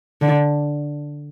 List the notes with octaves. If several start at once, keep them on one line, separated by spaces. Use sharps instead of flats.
D3